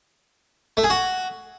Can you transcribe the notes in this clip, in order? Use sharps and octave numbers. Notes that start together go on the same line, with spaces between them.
A3
G#4
F#4